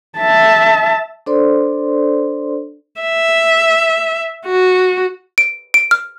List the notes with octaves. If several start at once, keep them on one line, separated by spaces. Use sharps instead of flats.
E5 A5
D4 A4 C5 D5 C6
E5
F#4
D7
D7
F6